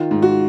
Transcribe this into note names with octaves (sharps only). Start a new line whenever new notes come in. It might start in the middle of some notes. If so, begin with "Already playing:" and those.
Already playing: D#3 F4
G#2
F#4